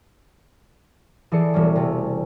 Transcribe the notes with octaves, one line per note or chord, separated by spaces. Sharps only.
E3 G#4 A4 D5 C7 C#7
E1 G3 C#4
C3 A3 C#4